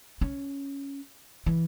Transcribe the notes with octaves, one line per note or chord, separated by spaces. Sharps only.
C#4
E3